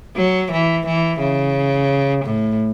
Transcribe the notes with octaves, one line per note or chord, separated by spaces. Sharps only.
F#3
E3
E3
C#3
A2